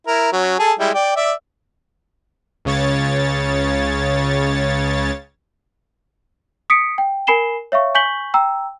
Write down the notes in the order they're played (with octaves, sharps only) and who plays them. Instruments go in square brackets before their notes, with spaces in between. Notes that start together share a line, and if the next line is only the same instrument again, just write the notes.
[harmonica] E4 A#4
F#3 C#4
G#4 A4 A5
G3 G#3 E4
D5 G5
D5 E5
[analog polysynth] C#2 C#3 C#5 A6
[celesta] D#6 B6 C#7 D7
G5
A#4 G#5 B5 C7 E7 G7
C#5 E5 F5 C#6
G#5 C#6 G6 B6 F#7 G7
G5 A#5 E6